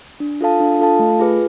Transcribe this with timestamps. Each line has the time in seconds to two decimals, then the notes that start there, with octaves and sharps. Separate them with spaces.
0.20 D4
0.41 F4 A4 F5 A5
0.60 D4
0.80 F4 A4 F5 A5
0.99 A3
1.19 F4 G#4 B4